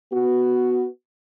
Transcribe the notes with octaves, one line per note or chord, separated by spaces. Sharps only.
B3 F#4